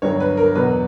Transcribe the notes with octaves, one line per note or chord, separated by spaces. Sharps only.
G1 G2 F#3 C#5
B4
A#4
E2 B2 F#3 B4